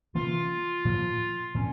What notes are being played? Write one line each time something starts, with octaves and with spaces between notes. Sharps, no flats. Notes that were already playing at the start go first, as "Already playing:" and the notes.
C3 E3 A#3 C#4 F4
A#2 F3 A#3
A#2 F3 C4 C#4